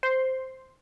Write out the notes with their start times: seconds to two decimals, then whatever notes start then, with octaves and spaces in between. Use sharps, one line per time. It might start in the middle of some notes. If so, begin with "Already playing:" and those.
0.03 C5 C6